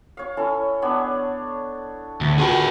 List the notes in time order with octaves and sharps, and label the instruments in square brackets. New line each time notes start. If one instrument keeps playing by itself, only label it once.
[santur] C#5 F5
C#4 E4 A4
B3 D4 C#5
[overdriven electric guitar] D2 [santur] A5
[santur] F4 F#4 A#4 [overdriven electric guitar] G#4 B4